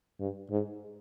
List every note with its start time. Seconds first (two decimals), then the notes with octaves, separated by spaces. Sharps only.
0.20 G2
0.50 G#2